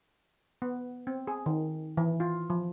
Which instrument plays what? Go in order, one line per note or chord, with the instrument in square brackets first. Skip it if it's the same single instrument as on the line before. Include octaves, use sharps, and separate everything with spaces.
[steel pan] B3
C4
G#4
D#3
E3
F4
F3